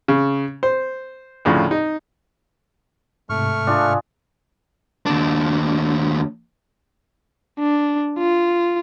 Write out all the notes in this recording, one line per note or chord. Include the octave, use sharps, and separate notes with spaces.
C#3
C5
D2 A2 C#3 F3
D#4
G#2 C3 A3 C#6 F6
D4 F4 G#4
D#2 D4
D4
F4